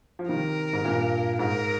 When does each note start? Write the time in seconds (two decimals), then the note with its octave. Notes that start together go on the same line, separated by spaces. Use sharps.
0.19 F3
0.29 C3 D#3 A#4
0.73 G#2
0.84 G2 A#2
1.39 G#2 A#4